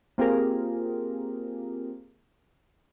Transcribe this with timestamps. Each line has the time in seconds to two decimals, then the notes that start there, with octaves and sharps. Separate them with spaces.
0.18 A#3 C4 F4 G4 G#4 A#4